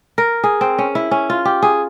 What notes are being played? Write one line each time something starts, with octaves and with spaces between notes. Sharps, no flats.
A#4
G#4
C4
C#4
E4
C#4
F4
G4
G#4